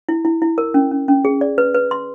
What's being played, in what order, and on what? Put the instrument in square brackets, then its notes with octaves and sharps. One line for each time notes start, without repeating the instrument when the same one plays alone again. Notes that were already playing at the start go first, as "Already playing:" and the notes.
[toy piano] E4
E4
E4
A#4
C#4
C#4
C#4
G#4
D5
B4
B4
C6